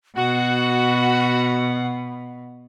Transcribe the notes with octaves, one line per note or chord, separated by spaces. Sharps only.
B2 F#4 F#5